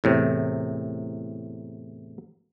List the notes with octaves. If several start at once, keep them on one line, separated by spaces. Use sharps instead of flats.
E2 A2 C3